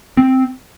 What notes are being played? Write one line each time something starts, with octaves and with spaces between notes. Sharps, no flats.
C4